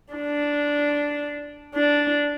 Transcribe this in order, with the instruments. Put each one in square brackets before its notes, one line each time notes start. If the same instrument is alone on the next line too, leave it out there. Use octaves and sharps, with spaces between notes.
[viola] D4
D4